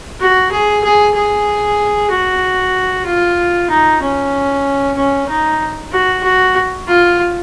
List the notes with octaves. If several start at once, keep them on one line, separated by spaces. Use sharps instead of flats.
F#4
G#4
G#4
G#4
F#4
F4
D#4
C#4
C#4
D#4
F#4
F#4
F4